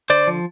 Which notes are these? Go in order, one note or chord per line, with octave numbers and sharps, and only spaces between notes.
D3 C5 D5
F3